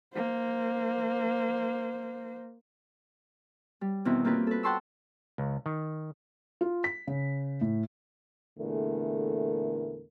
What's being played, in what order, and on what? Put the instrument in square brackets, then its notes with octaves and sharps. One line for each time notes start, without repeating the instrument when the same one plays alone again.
[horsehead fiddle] A#3 C5
[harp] G3
E2 B2 D#3 C4 E4
A#3 C4 F4 G4 A#4 B4
A4 B4
F#5 G5 A5 C6 C#6 E6
[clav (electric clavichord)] C#2
D#3
[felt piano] F4
B6
C#3
A2
[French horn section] E2 A#2 D3 A3 A#4